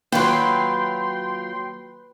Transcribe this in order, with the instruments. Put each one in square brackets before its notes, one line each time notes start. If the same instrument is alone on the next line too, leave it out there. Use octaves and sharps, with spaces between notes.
[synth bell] D#3 A#3 [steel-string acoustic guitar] F#3 F4 [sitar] B4 [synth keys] G5 C6